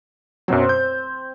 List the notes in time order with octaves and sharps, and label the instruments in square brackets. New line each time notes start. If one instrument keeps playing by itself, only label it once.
[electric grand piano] F#2 B2 F#3 [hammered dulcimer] C4 C5
[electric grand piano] G6